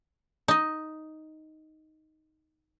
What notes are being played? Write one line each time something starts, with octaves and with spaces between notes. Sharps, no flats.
D#4 D#5